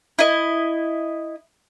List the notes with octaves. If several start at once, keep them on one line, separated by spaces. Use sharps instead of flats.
E4 D#5